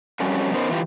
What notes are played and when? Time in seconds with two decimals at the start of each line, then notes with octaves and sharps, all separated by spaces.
0.20 F2 G3 A3 C#4 F#4 A#4
0.54 B3 C#4 D#4 A#4 C5
0.70 E3 F4 G4